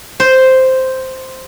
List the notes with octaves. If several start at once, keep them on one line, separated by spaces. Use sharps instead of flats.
C5